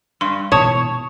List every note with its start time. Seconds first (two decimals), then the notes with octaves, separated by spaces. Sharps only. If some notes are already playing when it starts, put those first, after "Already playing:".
0.21 G2 C6
0.52 G#2 B2 E3 C#5 A5 D#6 G#6